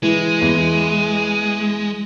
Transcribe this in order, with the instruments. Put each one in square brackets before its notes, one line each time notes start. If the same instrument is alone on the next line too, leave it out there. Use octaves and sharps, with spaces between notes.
[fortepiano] E3 [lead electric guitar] G#3 [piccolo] D#7
[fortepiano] E2